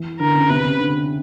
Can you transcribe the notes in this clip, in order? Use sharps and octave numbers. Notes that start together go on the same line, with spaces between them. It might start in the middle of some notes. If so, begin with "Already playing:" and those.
Already playing: E3
D3 A#4
C#3
C3 B4
C#3
D3